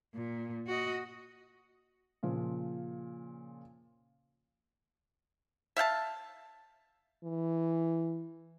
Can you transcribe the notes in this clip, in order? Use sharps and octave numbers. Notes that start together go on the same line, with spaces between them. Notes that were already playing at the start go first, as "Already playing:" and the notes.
A#2
F#4 D#5
A#2 C#3 F3
E5 F5 G5 A5
E3